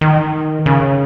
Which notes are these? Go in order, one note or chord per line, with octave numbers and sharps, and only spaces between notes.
D#3
C#3